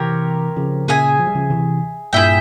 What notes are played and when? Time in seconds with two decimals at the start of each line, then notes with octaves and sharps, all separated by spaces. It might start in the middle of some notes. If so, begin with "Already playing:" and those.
Already playing: C3 E3 C4 G4 A#4 C#5
0.57 C#3 F3
0.88 A#2 C#3 G#4 E5 G#5
1.19 F3
1.27 G3
1.35 C#3 F3
1.50 C3 E3
2.13 G2 A#2 E4 G#4 E5 G5